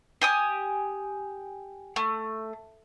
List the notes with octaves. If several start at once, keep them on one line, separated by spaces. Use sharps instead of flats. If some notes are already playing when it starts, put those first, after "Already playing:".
G4 G#5 D#6
A3